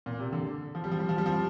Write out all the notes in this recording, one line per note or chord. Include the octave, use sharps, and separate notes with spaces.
A#2
C3
D3
F3
G3
F3
G3
F3
G3
F3